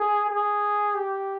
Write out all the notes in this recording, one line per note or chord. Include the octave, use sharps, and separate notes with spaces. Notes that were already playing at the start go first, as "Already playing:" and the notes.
Already playing: G#4
G#4
G4